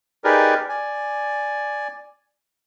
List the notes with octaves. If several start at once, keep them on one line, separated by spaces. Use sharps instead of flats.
D#4 G4 G#4 A#4 B4 D5
D5 G#5